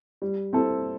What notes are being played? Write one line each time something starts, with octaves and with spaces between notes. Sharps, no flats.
G3
C4 E4 A4